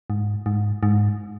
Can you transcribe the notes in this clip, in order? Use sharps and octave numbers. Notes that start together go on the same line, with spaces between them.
G#2
G#2
G#2